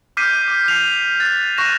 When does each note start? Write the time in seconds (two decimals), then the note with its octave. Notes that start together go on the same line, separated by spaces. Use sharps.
0.17 D6 F6 G6 B6 C7 D#7
0.48 D6
0.68 C7 F7
1.20 F#6 A6
1.58 C#6 F#6 A#6 E7